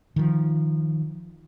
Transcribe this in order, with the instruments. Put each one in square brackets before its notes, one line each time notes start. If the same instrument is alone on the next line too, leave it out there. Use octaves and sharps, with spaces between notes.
[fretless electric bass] D#3 F3